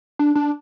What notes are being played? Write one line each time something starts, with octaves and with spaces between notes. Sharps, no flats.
D4
D4